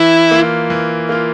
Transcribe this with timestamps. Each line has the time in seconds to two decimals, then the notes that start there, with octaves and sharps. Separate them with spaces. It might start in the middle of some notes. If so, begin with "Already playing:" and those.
Already playing: E3 E4
0.31 A#3 F4
0.70 E3
1.09 A#3 F4